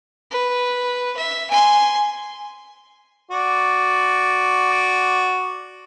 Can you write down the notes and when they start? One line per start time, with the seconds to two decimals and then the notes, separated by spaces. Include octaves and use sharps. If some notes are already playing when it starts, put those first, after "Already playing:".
0.31 B4
1.16 E5
1.51 G#5 C6
3.31 F#4 D5